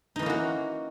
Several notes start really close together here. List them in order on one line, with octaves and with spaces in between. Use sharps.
D#4 E3 C#4 A#3 F#4